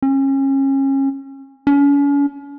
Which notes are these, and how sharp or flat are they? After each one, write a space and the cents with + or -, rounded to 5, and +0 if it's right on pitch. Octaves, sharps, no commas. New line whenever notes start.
C#4 -30
C#4 +40